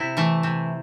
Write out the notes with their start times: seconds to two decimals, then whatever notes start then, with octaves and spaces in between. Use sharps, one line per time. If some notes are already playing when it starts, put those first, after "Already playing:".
Already playing: C3 E4
0.17 E3 A3
0.43 C3